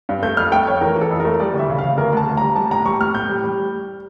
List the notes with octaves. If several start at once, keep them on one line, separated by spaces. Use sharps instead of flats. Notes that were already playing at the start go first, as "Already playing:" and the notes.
G2
A3 G6
F2 F6
A3 G5
F2 C#5
E3 A#4
E3
A4
F2
A#4
A3
G3 D5
D2
E5
C#3
F5
C#3
D2 A#4
D2 A5
D2
G3 A#5
G3 A5
A2 A#5
G3 C#6
A2 F6
A2 G6
G3
G3